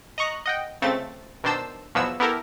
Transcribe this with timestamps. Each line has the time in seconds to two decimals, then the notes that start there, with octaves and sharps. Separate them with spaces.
0.18 D#5 A#5 C#6 F#6
0.46 D#5 F#5 G5
0.82 C#2 C#3 A3 C4 A6
1.44 B2 D#3 D4 C5 A5 E6
1.95 E2 B2 F3 F#3 B3 E6
2.20 B3 E4 G4 A4 A#4